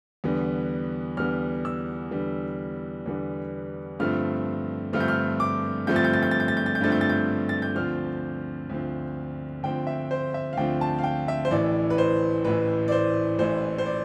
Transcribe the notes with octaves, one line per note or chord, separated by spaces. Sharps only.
E2 D3 G3 B3
E2 D3 G3 B3 F6
E6
E2 D3 G3 B3
E2 D3 G3 B3
G2 D3 F3 A3 C4 F6
G2 D3 F3 A3 C4 F6
G6
F6
D6
G2 D3 F3 A3 C4 G6
A6
G6
A6
G6
A6
G6
A6
G6
A6
G6
G2 D3 F3 A3 C4 A6
G6
A6
G6
A6
G6
D2 D3 F3 C4 F6
D2 D3 F3 C4
D2 D3 F3 C4 G5
E5
C5
E5
F5
D2 D3 F3 C4 G5
A5
F5
G5
E5
C5
A1 A2 E3 D5
B4
C5
A1 A2 E3 B4
D5
C5
A1 A2 E3 C5
C5
D5